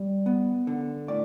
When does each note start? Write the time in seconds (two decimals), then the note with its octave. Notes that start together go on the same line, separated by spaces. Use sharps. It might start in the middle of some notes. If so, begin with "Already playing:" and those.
Already playing: G3
0.26 B3
0.67 D3
1.08 A2 D5